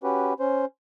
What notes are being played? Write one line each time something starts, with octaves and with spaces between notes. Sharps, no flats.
C#4 F#4 G4 B4
C#4 C5